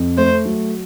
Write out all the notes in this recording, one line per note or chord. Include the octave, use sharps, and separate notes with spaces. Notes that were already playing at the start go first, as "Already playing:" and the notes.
Already playing: F2
A3 C5
F#3